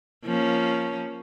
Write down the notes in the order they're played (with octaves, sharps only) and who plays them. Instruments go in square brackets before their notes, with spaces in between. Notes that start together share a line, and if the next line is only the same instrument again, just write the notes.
[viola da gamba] F3 A#3 C#4